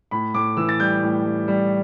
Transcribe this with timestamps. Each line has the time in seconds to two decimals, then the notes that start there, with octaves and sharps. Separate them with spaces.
0.11 A2 B5
0.34 A2 D6
0.57 E3 E6
0.69 A6
0.80 G3 G6
1.02 A2
1.25 G3
1.48 G3